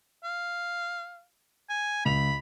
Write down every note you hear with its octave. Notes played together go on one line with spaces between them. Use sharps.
F5
G#5
C#2 B5 F7